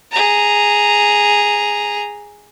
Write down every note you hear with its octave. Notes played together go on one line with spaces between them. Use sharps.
G#4 A#5